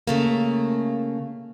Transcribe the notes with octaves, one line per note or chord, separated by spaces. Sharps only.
C#3 A3 A#3